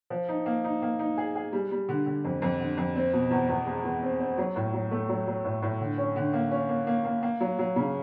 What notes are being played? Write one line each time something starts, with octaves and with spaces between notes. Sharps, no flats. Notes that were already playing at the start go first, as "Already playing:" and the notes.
F3
D#4
A#3
D#4
A#3
D#4
G#4
G#4
G3
G3
D3
D3
F2
F2
D3
F2
C4
B2
E2
E2
G#3
E2
C4
C4
F#3
A2
F#3
A3
F#3
F#3
A2
A2
D3
C#4
D3
A#3
C#4
A#3
A#3
A#3
A#3
F#3
F#3
C#3